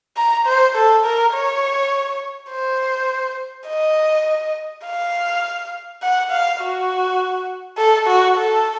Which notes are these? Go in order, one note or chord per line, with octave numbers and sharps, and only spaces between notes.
A#5
C5
A4
A#4
C#5
C5
D#5
F5
F#5
F5
F#4
A4
F#4
A4